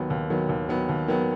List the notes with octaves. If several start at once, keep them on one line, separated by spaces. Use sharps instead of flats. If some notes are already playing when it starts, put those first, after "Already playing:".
Already playing: D#2 D#3 F#3 B3
D#2
D#3 F#3 B3
D#2
D#3 F#3 B3
D#2
D#3 F#3 B3